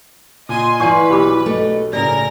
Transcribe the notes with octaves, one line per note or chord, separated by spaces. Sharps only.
A#2 D#5 G#5 C6
E3 E4 B4 D5 F5 G#5 C6 C#6
B1 G4 B5 D6
A3 D#5
A2 C#3 G#4 A#4 D5 A#6